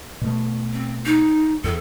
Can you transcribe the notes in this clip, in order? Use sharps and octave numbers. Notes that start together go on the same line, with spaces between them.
B2 A3
C4
D#4
E2 A4